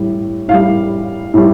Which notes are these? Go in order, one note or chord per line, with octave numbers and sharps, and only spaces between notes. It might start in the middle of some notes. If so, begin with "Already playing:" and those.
Already playing: A2 G3
A2 G3 F5
A2 G3